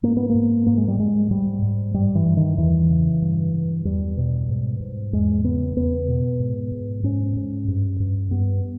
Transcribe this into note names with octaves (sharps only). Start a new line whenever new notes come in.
G#2 A#3
B3
G#2 A#3
G#2 A#3
G#3
G3
G#2 G#3
G#2 G3
G#2
G2 G3
E3
G2
D#3
E2 E3
C#3
G2
G2
E2 G3
B2
G#2
G#2
E2 G#3
C#3 B3
E2 B3
B2
G#2
G#2
G#2 C#4
G#2
G2
G2
G2 B3